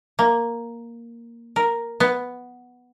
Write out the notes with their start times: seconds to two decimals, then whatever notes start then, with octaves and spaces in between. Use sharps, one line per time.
0.19 A#3
1.56 A#4
2.00 B3